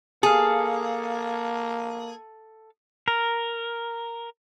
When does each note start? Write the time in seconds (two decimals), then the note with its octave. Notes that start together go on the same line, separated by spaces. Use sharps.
0.23 A#3 G#4 A4 F5
3.08 A#4